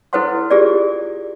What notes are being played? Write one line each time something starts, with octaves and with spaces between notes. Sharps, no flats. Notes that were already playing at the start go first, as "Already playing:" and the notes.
E4 A4 B4 C5 F#5 C6
F4 G4 G#4 A#4 D5